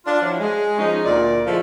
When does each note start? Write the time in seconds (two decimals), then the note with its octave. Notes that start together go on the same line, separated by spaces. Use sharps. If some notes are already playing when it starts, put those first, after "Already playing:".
0.05 D4 F4
0.21 F3 F#3 D4 E4 F4
0.40 G#3
0.78 F3 G#3 C#4 D#4
1.05 D2 A#2 D5
1.46 F3 G#3 A3 E4 F4